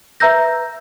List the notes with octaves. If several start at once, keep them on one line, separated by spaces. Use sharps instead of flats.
B4 E5 A#5 E6 G6 A#6